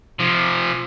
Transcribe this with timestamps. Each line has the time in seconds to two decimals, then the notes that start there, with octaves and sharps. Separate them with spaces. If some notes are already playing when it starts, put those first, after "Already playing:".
0.19 C3 F3